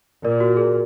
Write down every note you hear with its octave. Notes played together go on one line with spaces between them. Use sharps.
A#2 A#4 D5
F#4
G#4